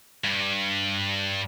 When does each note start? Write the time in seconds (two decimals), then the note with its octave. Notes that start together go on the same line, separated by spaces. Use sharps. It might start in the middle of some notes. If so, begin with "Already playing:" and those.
0.24 G2